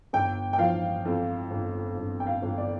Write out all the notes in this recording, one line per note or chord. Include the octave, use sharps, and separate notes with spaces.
G1 G5
G5
F3 F5
F2
G1
G1
G5
F5
G1
D5